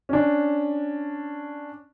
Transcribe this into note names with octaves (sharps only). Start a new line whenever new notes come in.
C#4 D4